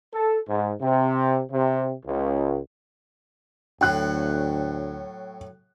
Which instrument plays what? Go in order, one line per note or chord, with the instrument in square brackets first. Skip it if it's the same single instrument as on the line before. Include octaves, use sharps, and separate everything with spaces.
[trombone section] A4
G#2
C3
C3
C#2
[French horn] D2 [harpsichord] A2 F#3 [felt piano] G5 F#6